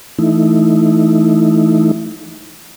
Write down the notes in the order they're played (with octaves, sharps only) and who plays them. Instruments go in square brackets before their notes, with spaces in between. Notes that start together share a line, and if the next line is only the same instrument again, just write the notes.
[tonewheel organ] E3 A3 D#4 E4